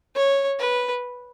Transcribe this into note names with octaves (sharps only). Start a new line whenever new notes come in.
C#5
B4